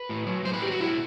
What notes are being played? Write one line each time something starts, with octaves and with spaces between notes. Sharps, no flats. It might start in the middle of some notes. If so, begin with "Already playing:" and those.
Already playing: B4
A2
F#3
A2 C5
B4
F#3 G4
F#4
B2 E4